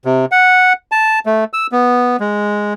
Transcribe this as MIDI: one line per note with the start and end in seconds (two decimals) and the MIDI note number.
0.05 0.25 48
0.32 0.73 78
0.92 1.19 81
1.26 1.44 57
1.53 1.67 88
1.72 2.17 59
2.20 2.74 56